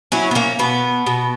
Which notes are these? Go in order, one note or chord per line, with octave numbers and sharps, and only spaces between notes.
F#3 C#4 E4
B3
A#3 C#4
B2 B3
B2